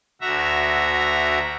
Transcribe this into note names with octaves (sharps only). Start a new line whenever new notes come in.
D2 F#4 E5 A#5